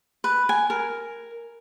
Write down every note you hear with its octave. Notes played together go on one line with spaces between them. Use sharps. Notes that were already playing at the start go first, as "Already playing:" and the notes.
B4
G#5
A#4